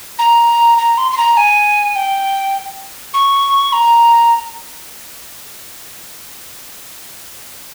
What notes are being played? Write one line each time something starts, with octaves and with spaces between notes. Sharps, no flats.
A#5
A#5
C6
C6
A#5
G#5
G5
C#6
A#5